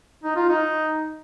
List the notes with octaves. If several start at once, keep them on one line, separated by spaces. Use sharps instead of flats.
D#4
F4
D#4